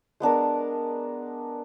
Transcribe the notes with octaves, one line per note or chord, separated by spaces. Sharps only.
G#3 B3 D4 A#4